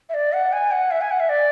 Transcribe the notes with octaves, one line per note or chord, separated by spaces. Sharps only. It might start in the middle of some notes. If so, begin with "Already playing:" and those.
E5
D5
F#5
G#5
F#5
E5
G#5
F#5
E5
D5